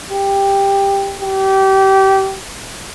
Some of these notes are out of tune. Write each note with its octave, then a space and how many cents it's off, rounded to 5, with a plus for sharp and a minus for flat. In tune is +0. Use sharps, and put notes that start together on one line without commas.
G4 +10
G4 -25